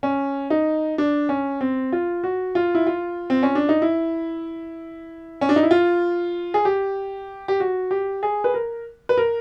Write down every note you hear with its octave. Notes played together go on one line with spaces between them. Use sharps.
C#4
D#4
D4
C#4
C4
F4
F#4
F4
E4
F4
C4
C#4
D4
D#4
E4
C#4
D4
D#4
E4
F4
G#4
G4
G4
F#4
G4
G#4
B4
A#4
B4
A#4